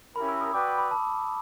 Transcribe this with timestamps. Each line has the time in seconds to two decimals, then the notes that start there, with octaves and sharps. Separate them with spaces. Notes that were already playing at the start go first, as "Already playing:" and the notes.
0.16 C#4 E4 G4 A#4 B5
0.29 E6
0.41 D#6
0.53 F#4 B4 D5 G5 D6
0.78 B5
0.91 A5